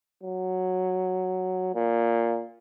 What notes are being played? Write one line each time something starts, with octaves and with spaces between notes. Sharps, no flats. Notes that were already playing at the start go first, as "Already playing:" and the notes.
F#3
A#2